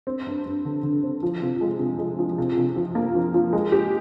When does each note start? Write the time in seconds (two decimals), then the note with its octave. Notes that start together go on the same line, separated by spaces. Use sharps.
0.07 C4
0.27 G2
0.46 G2
0.65 D3
0.83 D3
1.04 C4
1.23 F3
1.42 C3
1.61 G#3
1.80 C3
1.99 G#3
2.19 F3
2.38 C3
2.58 C3
2.76 F3
2.95 A#3
3.15 F3
3.34 F3
3.53 G#3
3.72 G4